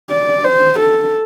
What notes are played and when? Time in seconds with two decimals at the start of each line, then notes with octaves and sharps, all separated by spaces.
0.10 D5
0.44 C5
0.80 A4